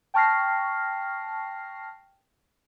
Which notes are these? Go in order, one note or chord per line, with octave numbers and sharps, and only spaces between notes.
G5 A5 C#6 F6 A#6 C7